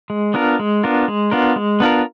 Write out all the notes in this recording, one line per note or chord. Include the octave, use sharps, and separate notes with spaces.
G#3
B3 D4 F4 A#4
G#3
B3 D4 F4 A#4
G#3
B3 D4 F4 A#4
G#3
B3 D4 F4 A#4